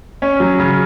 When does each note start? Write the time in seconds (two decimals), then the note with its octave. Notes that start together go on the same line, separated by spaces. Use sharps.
0.22 C#4
0.40 F#3
0.59 C#3